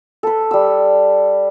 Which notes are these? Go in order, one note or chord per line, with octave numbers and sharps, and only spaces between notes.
A4 B4
G3 E6